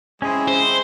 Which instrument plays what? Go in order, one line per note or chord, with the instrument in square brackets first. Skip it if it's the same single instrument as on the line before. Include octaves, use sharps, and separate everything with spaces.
[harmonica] G#3 C4 E4 [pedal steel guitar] C#4 G#4
[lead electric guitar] C5